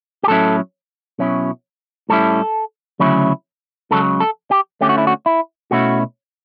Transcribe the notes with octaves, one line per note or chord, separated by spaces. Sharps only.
G4
A2 F#3 C#4 E4 A4
B2 F#3 C#4 E4
A2 G3 C#4 E4 A4
D2 C#3 F#3 C#4 E4
C#2 C#3 F#3 A4
A4
G4
D2 D3 A3 C#4 G4
F#4
E4
F#4
E4
B2 A3 C#4 E4 F#4